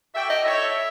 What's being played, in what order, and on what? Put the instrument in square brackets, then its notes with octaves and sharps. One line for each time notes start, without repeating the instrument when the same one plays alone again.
[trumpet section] F#4 A4 D5 G5 [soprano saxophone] E5
[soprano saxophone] D#5
[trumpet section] E4 A4 C#5 [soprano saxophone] E5